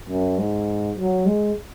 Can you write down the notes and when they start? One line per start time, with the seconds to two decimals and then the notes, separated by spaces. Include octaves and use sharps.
0.09 F#2
0.38 G#2
0.97 F#3
1.26 G#3